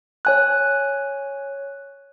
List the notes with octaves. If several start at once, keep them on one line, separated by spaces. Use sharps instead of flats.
C#5 G#5 F#6